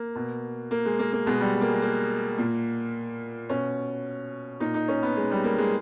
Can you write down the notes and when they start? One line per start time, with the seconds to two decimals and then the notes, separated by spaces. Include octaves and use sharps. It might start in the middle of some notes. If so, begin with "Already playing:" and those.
Already playing: A#3
0.15 B2
0.71 A#3
0.85 G#3
0.99 A#3
1.13 A#3
1.26 B2 G#3
1.41 G3
1.54 G#3
1.61 A#3
1.68 G#3
1.82 A#3
2.38 A#2
3.50 B2 C#4
4.60 A#2 D#4
4.74 D#4
4.88 C#4
5.03 B3
5.17 G#3
5.31 G3
5.44 A#3
5.58 G#3